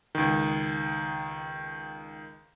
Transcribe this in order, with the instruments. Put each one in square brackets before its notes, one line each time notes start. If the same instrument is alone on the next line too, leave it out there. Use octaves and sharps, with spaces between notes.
[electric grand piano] C#2 D#3